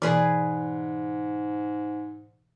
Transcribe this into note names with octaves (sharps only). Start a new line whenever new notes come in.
G#2 B2 E3 G#4 B4 D5